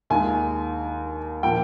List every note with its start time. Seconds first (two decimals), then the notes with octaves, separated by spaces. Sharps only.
0.10 D#2 D#3 G#3 G#5
1.43 A#2 F3 A#3 G5